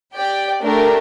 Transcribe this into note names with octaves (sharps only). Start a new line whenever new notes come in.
G4 D5 G5
A3 D4 G4 A#4